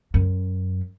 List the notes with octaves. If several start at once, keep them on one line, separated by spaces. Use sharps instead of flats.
F#2